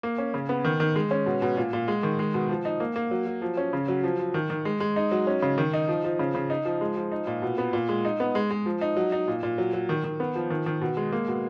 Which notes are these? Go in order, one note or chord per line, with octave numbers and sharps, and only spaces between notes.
A#3
C#4
C#3
B3
D#3
D#3
G#3
C#4
B2
B2
A#2
A#2
G#3
D#3
G#3
B2
F3
D#4
A#3
A#3
F#3
F#3
F3
C#4
C#3
F#3
F3
F3
D#3
D#3
G#3
G#3
D#4
F#3
C#4
C#3
D#3
D#4
F3
F3
C#3
C#3
D#4
F3
G#3
F3
D#4
A#2
B2
B3
A#2
G#3
D#4
B3
G#3
G#3
F3
D#4
F#3
D#4
A#2
A#2
F#3
F#3
D#3
D#3
B3
F3
D#3
D#3
B2
G#3
A#3
B2